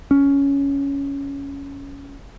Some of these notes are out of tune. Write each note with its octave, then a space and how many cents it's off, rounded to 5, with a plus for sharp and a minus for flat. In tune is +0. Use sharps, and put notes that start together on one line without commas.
C#4 +10